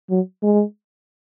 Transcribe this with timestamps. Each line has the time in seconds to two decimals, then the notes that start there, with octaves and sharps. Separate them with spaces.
0.10 F#3
0.43 G#3